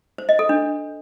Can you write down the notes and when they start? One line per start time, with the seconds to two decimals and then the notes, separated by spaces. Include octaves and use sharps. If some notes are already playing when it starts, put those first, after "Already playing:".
0.18 C5
0.29 D#5
0.39 A4
0.49 D4